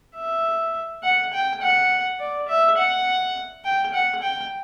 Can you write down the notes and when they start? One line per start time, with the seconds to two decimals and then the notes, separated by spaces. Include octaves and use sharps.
0.16 E5
1.03 F#5
1.33 G5
1.62 F#5
2.20 D5
2.48 E5
2.78 F#5
3.65 G5
3.94 F#5
4.22 G5